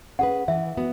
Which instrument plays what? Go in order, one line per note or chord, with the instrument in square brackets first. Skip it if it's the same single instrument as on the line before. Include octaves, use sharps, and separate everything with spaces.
[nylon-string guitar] C#4 G#4 B4 [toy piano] F#5
[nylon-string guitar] E3 [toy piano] E5
[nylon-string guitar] B3 F#4